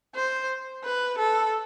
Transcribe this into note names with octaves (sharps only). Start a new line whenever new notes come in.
C5
B4
A4